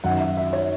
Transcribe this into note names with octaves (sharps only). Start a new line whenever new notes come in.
F#2 D#3 F#5
E5
E5
C#5